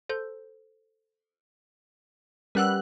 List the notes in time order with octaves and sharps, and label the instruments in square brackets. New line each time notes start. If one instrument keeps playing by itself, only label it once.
[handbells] A4 C5 G6
[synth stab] G3 F#6 [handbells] C#4 A#4 [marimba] B4 F#5 E6